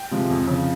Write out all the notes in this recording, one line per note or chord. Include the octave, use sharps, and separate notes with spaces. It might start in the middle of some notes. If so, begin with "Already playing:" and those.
Already playing: G5
C3 F3 G#3
F2
C#3 F3